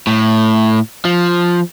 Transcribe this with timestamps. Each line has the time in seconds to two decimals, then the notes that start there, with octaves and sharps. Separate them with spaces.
0.07 A2
1.05 F3